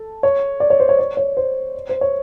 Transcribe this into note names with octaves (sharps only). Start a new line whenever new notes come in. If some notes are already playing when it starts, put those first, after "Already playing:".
Already playing: A4
C#5
D5
C#5
C5
C#5
C#5
C#5
C5
C5
C#5